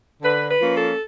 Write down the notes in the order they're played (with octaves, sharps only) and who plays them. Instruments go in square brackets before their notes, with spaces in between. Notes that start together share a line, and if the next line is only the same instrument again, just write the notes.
[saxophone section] D3 B4
B4
F3 A#3 C#4
A4